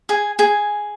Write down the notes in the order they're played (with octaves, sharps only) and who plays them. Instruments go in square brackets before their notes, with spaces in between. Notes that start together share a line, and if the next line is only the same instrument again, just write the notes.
[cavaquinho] G#4 G#5
G#4 G#5